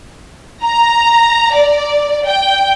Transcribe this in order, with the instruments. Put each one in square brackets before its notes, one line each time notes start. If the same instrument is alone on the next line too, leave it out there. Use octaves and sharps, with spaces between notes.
[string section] A#5
D5
G5